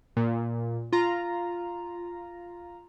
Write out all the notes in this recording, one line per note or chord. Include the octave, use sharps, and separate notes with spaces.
A#2
F4 A#5